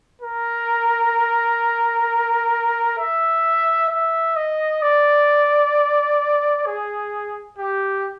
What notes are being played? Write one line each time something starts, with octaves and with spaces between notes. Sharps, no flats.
A#4
E5
E5
D#5
D5
G#4
G4